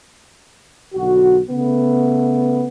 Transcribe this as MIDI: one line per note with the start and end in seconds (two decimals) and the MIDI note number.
0.94 1.39 35
0.94 1.39 50
0.94 1.39 66
1.48 2.68 49
1.48 2.68 57
1.48 2.68 59